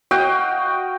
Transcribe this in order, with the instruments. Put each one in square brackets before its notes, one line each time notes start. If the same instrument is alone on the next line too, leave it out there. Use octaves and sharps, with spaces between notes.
[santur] F#4 D#5 F5 G5